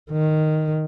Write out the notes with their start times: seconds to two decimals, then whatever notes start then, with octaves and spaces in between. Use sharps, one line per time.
0.11 D#3